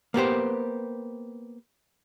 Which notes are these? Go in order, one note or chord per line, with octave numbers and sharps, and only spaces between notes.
A#3 B3 G4 C5